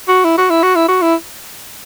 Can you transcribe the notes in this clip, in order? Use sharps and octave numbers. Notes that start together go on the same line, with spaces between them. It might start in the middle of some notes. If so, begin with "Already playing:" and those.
F#4
E4
F#4
E4
F#4
E4
F#4
E4